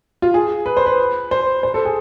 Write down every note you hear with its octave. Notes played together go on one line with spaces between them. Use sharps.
F4
G#4
B4
C5
B4
C5
C5
A4
G#4